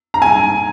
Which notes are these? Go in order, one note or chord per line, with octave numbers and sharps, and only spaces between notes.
A#5
G#5